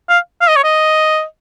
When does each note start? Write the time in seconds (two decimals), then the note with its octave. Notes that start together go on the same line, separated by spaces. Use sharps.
0.09 F5
0.41 F5
0.48 D#5
0.56 C#5
0.64 D#5